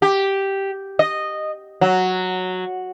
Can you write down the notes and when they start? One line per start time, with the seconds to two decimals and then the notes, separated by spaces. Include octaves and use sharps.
0.02 G4
0.99 D#5
1.81 F#3